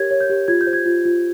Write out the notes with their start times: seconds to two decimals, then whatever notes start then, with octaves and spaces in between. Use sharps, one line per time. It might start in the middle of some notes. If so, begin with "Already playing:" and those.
Already playing: G4 A#4 C#5 G#6
0.11 C#5
0.20 G6
0.30 G4
0.48 F4 G#6
0.61 G6
0.67 C5
0.73 G#6
0.86 F4
1.05 F4